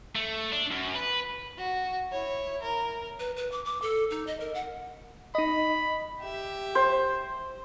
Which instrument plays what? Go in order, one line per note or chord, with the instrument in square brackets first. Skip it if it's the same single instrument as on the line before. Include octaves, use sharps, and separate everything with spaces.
[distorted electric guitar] A3
D4
F#2
B4
[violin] F#4
E4 C#5
A#4
[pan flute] B4
B4
D6
D6
A4
D#4
D#5
A#4
F#5
[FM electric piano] D#4 D#5 [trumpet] B5
[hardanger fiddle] G4 E5
[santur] C5